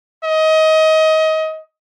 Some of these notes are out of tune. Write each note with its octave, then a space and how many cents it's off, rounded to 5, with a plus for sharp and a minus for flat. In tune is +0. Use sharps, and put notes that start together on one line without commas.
D#5 +25